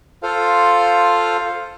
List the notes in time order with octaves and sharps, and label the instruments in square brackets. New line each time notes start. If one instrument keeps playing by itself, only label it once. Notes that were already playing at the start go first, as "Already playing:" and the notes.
[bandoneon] F4 A4 C5 F5